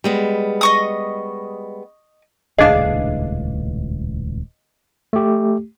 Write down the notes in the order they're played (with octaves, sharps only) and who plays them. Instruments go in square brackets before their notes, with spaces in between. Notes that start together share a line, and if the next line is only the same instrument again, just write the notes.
[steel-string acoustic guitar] G3 G#3 B3
[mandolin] D#5 C#6 D#6
[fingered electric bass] D#1 C#2 A2 [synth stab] D4 G#4 [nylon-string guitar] B4 F5 [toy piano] D#5
[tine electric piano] A3 G4